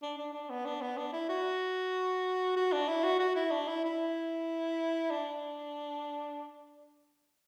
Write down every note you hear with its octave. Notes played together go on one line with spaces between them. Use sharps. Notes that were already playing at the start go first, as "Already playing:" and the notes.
D4
D4
D4
B3
D4
B3
D4
E4
F#4
F#4
D4
E4
F#4
F#4
E4
D4
E4
E4
D4